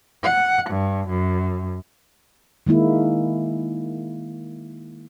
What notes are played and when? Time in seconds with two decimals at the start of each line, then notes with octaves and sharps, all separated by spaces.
0.24 F#5
0.70 G2
1.08 F#2
2.67 D#3 G#3 A#3 E4